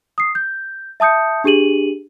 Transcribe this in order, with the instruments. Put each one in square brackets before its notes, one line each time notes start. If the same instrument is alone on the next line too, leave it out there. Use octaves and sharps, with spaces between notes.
[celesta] D#6 C7
G6
E5 A5 D#6 G6 C#7
D4 G4 G#4 D#7 F#7